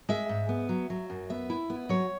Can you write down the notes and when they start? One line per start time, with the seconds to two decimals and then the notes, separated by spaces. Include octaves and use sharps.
0.09 G#3 E5
0.29 G#2
0.49 B3
0.69 F#3
0.90 F#3
1.10 F#2
1.30 B3 E5
1.50 E4
1.70 B3
1.89 F#3 C#5